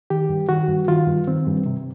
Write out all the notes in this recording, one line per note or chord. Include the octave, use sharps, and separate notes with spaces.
D#3 G4
G2
D#3 F#4
G2
D#3 F4
G2
D#3 C4
G2
C3